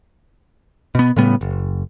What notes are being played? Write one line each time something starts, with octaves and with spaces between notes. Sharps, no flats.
B2 B3
A2 C#3 G3 B3
F#1